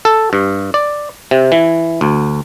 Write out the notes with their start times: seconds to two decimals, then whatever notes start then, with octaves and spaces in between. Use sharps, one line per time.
0.05 A4
0.33 G2
0.74 D5
1.31 C3
1.52 E3
2.01 D2